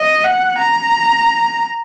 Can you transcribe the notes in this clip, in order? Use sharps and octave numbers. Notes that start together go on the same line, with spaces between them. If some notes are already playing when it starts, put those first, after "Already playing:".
Already playing: D#5
F#5
A#5